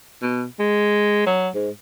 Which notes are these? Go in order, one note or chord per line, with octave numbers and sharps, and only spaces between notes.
B2
G#3
F#3
G#2